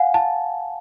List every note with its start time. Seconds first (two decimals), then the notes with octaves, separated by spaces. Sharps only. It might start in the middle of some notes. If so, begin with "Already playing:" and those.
Already playing: F5 F#5 G#5
0.14 A5